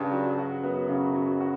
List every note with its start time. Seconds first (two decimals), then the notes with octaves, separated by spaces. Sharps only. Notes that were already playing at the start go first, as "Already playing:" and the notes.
Already playing: G2 C#3
0.11 F#3
0.38 F#4
0.63 F#2 B3
0.89 C#3
1.15 F#3
1.41 F#4